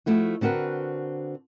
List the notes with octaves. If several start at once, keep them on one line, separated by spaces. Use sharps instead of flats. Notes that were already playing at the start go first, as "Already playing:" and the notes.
F3 A3 E4 F#4
D3 C4 F#4 A#4 B4